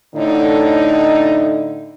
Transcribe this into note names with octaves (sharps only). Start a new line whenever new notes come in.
A2 D3 D#4